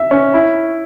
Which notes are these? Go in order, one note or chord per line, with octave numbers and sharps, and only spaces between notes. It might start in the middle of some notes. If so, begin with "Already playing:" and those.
Already playing: E5
C#4
E4